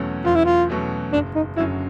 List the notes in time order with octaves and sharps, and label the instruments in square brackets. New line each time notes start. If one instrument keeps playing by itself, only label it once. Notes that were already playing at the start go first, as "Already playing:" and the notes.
Already playing: [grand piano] E2 B2 F#3 A3 C#4
[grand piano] E2 [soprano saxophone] F4
[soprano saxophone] E4
F4
[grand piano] B2 F#3 A3 C#4
[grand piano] F#1 [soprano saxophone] D4
[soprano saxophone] D#4
[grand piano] F#2 D3 F#3 [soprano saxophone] E4